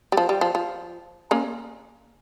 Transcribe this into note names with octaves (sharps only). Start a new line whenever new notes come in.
G3
F3
G3
F3
F3
A#3 C#4